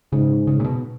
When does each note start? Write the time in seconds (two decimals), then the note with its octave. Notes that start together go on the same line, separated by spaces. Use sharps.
0.12 G#2 C#3
0.47 C#3
0.60 A#2
0.65 B2